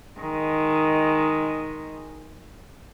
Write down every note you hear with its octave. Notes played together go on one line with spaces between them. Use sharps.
D#3 G#3